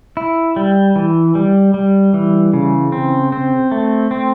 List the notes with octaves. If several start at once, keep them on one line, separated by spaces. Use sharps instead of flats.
E4
G3
E3
G3
G3
E3
C#3
C4
C4
A3
C4